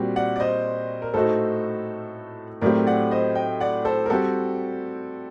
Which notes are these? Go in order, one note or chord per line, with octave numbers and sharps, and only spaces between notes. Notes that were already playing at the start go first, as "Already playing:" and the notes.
Already playing: A#2 G3 C4 F#4
D5 F#5
D5
C5 D#5
A#4
A2 A3 D#4 F#4 A4 C5
A2 F#3 A3 C4 G4 A#4 D5
D5 F#5
C5 D#5
D#5 G5
D5 F#5
A4 C5
A#4
G3 C4 F#4 G4 A4